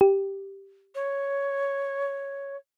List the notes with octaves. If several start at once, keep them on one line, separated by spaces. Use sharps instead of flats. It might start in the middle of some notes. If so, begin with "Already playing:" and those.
G4
C#5